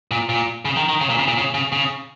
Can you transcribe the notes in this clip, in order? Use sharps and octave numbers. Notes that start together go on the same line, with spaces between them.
A#2
A#2
C#3
D#3
D#3
C#3
A#2
C#3
A#2
C#3
C#3
C#3